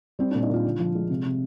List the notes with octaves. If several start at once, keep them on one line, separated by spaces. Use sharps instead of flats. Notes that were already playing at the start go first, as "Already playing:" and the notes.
G3 C4
D4
A#2
D#4
A#2 F4
D3
F3
G#3
C3
C3